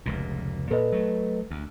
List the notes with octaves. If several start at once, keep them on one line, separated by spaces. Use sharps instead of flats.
F1 C#2 A#2
A#2 A4 B4 D#5
F#3 A3
D2